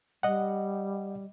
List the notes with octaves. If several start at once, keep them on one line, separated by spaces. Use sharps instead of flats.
G3 D#5 F#5